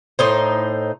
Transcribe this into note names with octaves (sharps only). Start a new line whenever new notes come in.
A2 D#4 C5